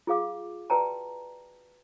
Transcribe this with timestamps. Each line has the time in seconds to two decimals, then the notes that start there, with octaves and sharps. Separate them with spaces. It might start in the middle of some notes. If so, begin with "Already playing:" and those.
0.07 F4 G#4 F5 D6
0.70 F#4 B4 D5 G5 A5 A#5